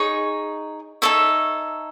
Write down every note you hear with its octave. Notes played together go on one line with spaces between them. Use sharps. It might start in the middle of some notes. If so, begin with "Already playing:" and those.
Already playing: D#4 G#4 C#5
D#4 A4 C#5 E5